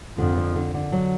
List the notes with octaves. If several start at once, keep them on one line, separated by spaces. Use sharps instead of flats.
F2 D3
D3
D3
D3
F#3